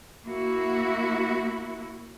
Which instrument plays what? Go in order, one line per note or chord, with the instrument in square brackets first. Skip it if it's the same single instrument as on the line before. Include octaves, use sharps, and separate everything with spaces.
[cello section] A#3 E4 F#4